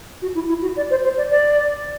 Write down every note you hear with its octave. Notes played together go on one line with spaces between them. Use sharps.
F#4
E4
E4
F#4
D5
C5
C5
D5
D5